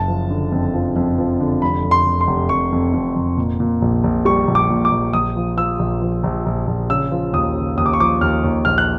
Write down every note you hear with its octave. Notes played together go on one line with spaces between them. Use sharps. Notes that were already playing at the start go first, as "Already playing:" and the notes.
Already playing: F#1 A5
F3
D3
F2
F3
F2
F3
D3
F1 B5
F1
C6
F1
C6
F1
F1 C#6
F2
F2
F1
A#2
A#2
A#1
A#1
G3 C#6
A#1
D6
A#2
D6
A#1
A#1 D#6
F3
F3 E6
A#1
F3
A#1
A#1
A#1
C#3 E6
F3
D#2 D#6
C#3
D#2 D#6
D6
C#6
F3 D6
D#2 F6
D#2
A#1 F6
F#6